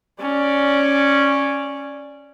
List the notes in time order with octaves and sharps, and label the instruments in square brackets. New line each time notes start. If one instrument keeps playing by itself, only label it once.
[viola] C#4 D5